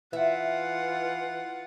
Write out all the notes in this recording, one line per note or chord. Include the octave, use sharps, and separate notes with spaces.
E3 F4 E5 F#5